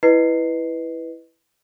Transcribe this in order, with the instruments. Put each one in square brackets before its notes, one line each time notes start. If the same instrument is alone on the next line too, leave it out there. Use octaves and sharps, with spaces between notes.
[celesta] E4 B4 D#5 C7